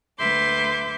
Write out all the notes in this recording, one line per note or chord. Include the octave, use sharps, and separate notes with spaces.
D2 B4 E5 C6 D6 G6